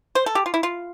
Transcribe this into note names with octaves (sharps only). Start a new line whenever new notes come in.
C5
A4
G4
F4
E4
F4